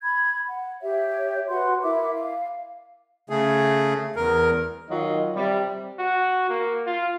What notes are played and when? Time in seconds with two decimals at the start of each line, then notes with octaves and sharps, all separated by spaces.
0.04 B5 G#6
0.47 F#5
0.81 G4 C#5 E5
1.48 F#4 B4 F#5 C6
1.82 E4 A#4 E5 D6
2.14 F5
3.30 C#3 A3 G#4
4.16 E2 A#4
4.90 D#3 F#3 F4 D#5
5.36 C3 G3
5.99 F#4
6.49 A#3
6.87 F4